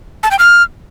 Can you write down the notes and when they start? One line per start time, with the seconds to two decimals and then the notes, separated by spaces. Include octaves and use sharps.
0.23 A5
0.31 G5
0.39 F6